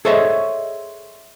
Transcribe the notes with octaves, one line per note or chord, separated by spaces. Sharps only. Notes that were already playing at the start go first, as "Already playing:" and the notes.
G#4 A4 C5 C#5 D#5 E5